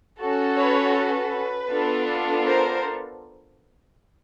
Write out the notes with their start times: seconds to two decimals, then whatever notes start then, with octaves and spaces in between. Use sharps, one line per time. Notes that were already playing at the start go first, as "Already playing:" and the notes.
0.20 C#4 F#4 A4
0.57 B4 C#5
0.95 B4
1.70 B3 D4 F4 A4
2.45 A#4 C5